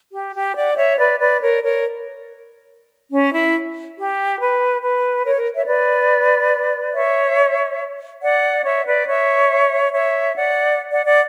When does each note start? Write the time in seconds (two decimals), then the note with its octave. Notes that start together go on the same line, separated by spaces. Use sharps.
0.13 G4
0.34 G4
0.55 D5 F#5
0.77 C#5 E5
0.98 B4 D5
1.19 B4 D5
1.41 A#4 C#5
1.62 A#4 C#5
3.11 C#4
3.32 E4
3.96 G4
4.39 B4
4.81 B4
5.24 A#4 C#5
5.34 A#4
5.56 C#5 E5
5.66 B4 D5
6.94 C#5 E5
8.22 D5 F#5
8.64 C#5 E5
8.86 B4 D5
9.07 C#5 E5
9.92 C#5 E5
10.35 D5 F#5
10.92 D5 F#5
11.06 D5 F#5